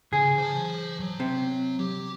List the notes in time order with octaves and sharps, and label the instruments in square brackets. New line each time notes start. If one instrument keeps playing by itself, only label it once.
[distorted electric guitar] C#3 [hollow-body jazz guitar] G#4
[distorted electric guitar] C5 A5
F#3
[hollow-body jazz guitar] C3
[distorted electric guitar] G4